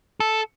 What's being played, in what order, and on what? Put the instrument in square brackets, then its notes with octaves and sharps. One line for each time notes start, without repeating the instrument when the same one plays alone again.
[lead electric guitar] A4